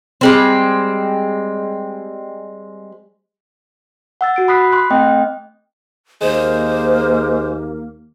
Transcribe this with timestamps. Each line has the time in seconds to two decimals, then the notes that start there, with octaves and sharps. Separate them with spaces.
0.21 G3 G#3 C4
4.21 F#5 E6 A6
4.36 F#4 D7
4.48 B5 D#6 F#6 B6 C7
4.72 C6 F#6
4.90 A3 C4 D#5 G5
6.22 D#2 G#3 A#3 C5